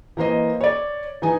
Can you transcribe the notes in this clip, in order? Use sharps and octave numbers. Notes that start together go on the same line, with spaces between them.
E3 A#3 C5 D#5
C#5 D5
E3 D#4 G#5